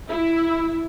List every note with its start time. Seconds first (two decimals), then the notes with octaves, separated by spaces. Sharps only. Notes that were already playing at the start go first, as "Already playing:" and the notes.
0.10 E4